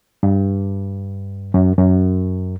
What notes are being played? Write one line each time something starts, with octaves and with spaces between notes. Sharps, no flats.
G2
F#2
F#2